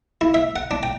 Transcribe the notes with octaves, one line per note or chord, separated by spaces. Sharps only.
E4
E5
F#5
D4
G5